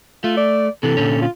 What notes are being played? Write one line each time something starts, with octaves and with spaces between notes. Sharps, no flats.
A3 F4
D5
C3 E3 A4
A#2 D3 C#4
F4